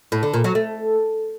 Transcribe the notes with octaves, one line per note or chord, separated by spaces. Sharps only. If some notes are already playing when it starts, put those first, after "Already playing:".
A2
D3
A#2
F#3
A3